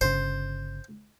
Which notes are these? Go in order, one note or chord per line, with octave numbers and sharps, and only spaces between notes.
G1 C#3 C5